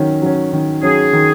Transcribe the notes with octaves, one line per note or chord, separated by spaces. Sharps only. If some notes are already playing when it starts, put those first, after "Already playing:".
Already playing: D#3 F#3 C#4
F#3 C#4
D#3
F#3 C#4 G#4
D#3